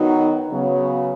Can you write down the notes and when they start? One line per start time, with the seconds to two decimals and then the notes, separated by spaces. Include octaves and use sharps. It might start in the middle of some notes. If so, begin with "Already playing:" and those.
Already playing: D#3 F#3 B3 D#4 F#4
0.51 C#3 F#3 B3